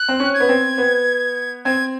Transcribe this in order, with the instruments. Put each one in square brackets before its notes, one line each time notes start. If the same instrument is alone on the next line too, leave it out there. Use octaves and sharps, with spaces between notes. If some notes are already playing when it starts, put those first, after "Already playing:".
Already playing: [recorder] F#6
[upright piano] C4
C#4
[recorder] G#6
[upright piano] B3
C4
B3
[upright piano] C4 [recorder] G#6